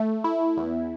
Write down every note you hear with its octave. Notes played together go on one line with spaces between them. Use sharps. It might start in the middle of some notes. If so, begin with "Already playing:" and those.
Already playing: A3
E4
E2